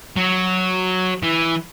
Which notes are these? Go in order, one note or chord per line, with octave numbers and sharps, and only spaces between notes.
F#3
E3